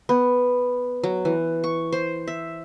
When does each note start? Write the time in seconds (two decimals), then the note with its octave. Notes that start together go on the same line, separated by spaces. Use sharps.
0.09 B3
1.04 F#3
1.25 E3
1.64 C#6
1.93 C5
2.27 E5